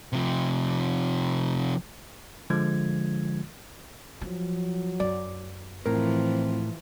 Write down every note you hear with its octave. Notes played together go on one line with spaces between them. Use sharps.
C3 F3
D3 F3 G#3 F4 G#6
F3 F#3
F#2 D5
A2 E3 F3 C4 A#4